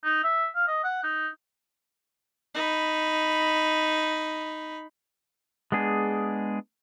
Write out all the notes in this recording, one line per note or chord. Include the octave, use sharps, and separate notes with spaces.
D#4
E5
F5
D#5
F#5
D#4
D#4 B5
G#3 B3 D4 G#4